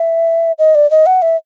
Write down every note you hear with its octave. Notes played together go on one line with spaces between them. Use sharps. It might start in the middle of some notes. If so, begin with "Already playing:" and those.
Already playing: E5
D#5
D5
D#5
F#5
E5